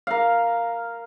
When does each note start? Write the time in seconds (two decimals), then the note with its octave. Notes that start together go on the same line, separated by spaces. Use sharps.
0.07 A#4 F5